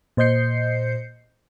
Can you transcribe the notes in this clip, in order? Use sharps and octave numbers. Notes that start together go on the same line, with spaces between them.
A#2 C5 D#5 G6 C7 C#7